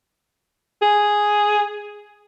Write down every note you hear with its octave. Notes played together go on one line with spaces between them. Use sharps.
G#4